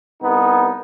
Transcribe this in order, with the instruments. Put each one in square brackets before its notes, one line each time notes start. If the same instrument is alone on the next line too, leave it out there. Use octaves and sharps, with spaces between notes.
[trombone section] C2 B3 D#4